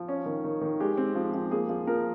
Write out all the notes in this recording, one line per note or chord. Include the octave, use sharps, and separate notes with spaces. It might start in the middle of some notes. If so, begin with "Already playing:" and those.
Already playing: F3
C#4
D#3
D#3
D#3
G#3 G4
C4
F3
F3
A#3 G#4
F3
F3 A#4